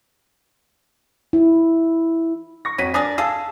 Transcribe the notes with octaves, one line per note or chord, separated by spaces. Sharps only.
E4
C#6 A#6
F2 F#3 B6 D#7
D4 A#4 D5 G#5 D#6 A#6
G#4 A4 F5 E6